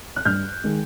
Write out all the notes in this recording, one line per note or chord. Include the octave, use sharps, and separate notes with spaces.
F#6
G2 F6 G6
D#3 G#3